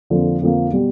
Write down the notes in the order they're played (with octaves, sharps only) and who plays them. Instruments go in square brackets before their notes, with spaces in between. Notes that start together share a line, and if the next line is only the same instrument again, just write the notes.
[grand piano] F2 D3 F3 A#3
F2 D3 F3 A#3
B2 G3